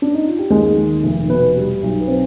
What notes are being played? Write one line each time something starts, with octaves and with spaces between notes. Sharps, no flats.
D4
D#4
F4
G4
D#2 G#3 G#4
D#3
F1
B2 B3 B4
G3
B1
B4
C4 C5